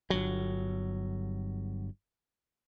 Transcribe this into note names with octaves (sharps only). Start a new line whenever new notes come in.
G1 F#3